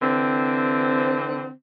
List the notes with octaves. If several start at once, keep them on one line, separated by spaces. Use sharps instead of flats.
D3 E3 C4